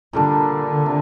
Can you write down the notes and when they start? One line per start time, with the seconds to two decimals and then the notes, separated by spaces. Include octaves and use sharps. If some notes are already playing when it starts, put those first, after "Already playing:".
0.13 A#2 D3 G3 D4
0.86 C3